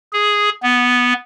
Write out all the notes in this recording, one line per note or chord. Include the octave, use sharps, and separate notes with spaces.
G#4
B3